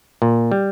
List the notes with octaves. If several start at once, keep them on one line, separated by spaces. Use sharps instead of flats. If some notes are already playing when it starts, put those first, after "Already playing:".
A#2
G3